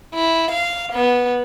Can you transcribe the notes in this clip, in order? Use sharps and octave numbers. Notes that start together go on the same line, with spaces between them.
E4
F5
B3